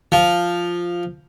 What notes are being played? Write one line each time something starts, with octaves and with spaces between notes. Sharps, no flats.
F3